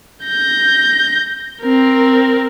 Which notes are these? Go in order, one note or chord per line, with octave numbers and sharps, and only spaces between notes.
G6 A#6
C4 A#4